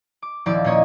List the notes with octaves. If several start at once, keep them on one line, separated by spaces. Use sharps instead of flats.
D6
D#1 F3 E4 D5 D6
A#2 A#3 C#4 C#5 D#5